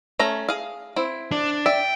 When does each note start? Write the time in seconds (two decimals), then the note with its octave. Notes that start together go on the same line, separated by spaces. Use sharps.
0.19 A3 C#4 A#5
0.49 G#4 F5
0.96 C4 E4
1.32 D4
1.66 D5 E5 G5